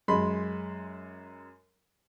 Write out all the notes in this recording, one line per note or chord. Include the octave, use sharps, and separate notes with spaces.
F#2 G#3 B5 C6